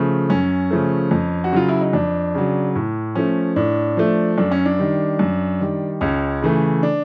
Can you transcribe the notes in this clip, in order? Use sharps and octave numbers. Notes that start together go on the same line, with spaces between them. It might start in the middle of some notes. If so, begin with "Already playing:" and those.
Already playing: C#3 F3 A3
F#2 C#4
C#3 F3 A3
F2
F#4
C#3 F#3 F4
E4
D#4
F2 D4
C#3 F#3
A2
F3 A3 C#4
A2 D4
F3 A3
F#2 D4
C#4
D4
D#3 G3
F#2
D#3 G3
C#2 C#4
C#3 E3 A3
D4